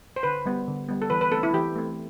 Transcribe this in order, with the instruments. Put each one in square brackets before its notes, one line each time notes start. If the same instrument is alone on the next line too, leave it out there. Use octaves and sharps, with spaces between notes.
[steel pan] C5
D3 B4
G3 B3
D3
G3 B3
A4
E3 B4
B4
A3 C4 A4
E4
E3 G4
A3 C4